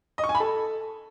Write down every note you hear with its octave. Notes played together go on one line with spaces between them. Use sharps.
D#5
C#6
G#5
B5
A4